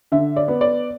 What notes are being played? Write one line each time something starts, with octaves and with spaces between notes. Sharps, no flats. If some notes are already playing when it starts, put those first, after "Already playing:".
D3 E5
D5
B3
D5